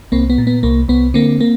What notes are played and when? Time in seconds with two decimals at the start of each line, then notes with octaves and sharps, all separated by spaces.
0.12 C2 A#3 C4
0.30 B3
0.38 A#2
0.47 B3
0.63 C2 A#3
0.88 C2 B3
1.14 D3 A#3 C4
1.41 A#3